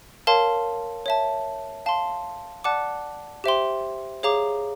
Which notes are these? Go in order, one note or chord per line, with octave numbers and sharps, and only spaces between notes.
A#4 C#5 F5 A5 C6
C#5 E5 A5
F5 A5 C6
D5 F#5 A5 D6 F#6
G4 C5 E5 G5 C6
G#4 C#5 F5 A#5 D6